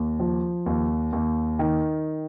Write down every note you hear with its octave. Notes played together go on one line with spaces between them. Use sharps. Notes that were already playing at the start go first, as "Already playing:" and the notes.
Already playing: D#2
F3
D#2
D#2
D#3